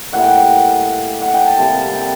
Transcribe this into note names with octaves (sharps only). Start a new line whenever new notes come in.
A2 G3 A#3 F#5
G5
F#5
F#5
G5
A5
C3 G3 A#3 A5
A5
G5